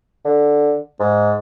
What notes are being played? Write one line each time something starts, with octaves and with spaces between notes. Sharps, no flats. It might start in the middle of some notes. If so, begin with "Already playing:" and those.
D3
G#2